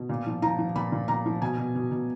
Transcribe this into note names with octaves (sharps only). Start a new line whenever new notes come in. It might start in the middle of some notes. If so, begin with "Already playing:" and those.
Already playing: B2
A#2
F3
F3 A#5
F3
A#2 B5
A#2
A#2 A#5
F3
B2 G#5
B2
B2
B2